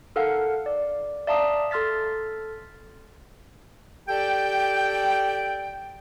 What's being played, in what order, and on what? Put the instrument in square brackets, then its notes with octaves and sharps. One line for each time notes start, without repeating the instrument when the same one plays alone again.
[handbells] D#4 A4 A#4 F5 F#5
D5
D5 E5 F5 A5 A#5 D#6
A4 C6 F6 A6 B6
[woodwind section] G4 A4 D5 G5